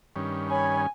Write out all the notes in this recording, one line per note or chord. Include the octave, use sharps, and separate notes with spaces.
G2 D#3 C#4
C#5 G#5 B5